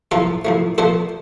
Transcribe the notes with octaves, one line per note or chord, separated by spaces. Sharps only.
A2 F3 A3 F4 A4
A2 F3 A3
A#2 F3 A3 A4 C5